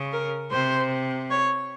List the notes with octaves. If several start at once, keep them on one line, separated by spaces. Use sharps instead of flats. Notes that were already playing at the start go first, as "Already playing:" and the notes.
Already playing: C#3
A#4
C3 C5
C#5